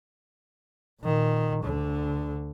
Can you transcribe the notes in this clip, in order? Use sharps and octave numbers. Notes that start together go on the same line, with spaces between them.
A#2 D#3
D2 D3